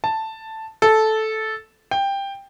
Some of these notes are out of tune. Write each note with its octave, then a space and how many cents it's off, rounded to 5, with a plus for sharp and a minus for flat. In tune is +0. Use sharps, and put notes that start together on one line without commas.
A5 +5
A4 -10
G5 +10